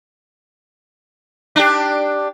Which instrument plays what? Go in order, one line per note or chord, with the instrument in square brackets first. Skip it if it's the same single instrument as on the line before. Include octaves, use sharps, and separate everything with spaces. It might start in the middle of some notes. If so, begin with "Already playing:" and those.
[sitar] D4 G4